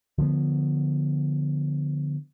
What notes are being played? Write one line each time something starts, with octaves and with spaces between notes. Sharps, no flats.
D3 F3 A3 B3